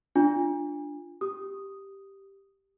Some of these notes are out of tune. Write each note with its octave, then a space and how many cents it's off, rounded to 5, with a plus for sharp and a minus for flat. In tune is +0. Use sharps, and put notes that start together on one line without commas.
D4 +0 F4 -10 G#5 -35
G4 +0 D#6 +0